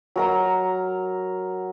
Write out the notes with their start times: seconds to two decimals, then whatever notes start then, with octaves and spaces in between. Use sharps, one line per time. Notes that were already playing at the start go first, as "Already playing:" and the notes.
0.16 F#3 A#4 A#5